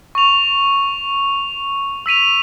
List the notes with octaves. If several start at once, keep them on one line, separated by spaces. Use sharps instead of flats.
C#6 F7
E6 B6 D#7 F7